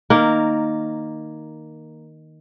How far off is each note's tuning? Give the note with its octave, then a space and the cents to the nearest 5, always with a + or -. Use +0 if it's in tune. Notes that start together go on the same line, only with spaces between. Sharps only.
D#3 +0 A#3 +0 A#4 -10